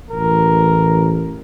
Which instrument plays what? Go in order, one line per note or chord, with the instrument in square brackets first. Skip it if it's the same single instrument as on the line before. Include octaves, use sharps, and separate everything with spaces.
[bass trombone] A1 [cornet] A#4